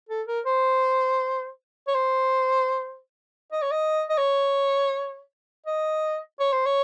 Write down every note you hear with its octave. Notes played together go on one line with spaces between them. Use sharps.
A4
A#4
C5
C#5
C5
D#5
C#5
D#5
D#5
C#5
D#5
C#5
C5
C#5